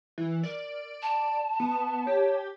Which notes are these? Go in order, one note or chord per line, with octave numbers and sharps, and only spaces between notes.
E3
A#4 D5
A5
B3
G4 C#5